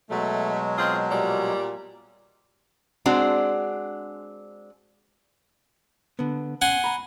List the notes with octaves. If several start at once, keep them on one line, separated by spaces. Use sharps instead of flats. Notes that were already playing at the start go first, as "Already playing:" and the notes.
B2 F#3 G#3 A3
C4 F4 G#4
A#2 G3
G#3 C4 D4 F#4
D3 B3
C#4 F#5 G#5 C6
A#5 B5